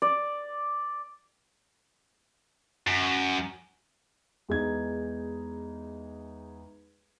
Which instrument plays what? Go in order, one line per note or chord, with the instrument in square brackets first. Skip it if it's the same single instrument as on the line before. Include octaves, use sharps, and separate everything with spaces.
[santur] D5
[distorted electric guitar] F#2
[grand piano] E2 G#3 D#4 G#6